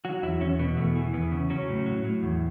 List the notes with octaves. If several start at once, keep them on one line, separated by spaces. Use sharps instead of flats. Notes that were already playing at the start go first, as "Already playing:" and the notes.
F#3 F#4
E2 E4
E2 C#4
B2 B3
E2 A3
E3
E2 B3
C#3
F#3 C#4
A2
F#3
A2
E2